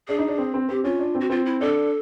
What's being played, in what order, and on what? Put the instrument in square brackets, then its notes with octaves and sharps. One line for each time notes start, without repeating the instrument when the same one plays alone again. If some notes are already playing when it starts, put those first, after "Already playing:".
[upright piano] D4 [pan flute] G#4
[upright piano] D#4
D4
C4
C4
[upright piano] C4 [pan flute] G4
[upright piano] C#4 [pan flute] F4
[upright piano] D4
C4
[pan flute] F#4
[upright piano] C4 [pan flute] F4
[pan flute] E4
[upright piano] D4 [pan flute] A4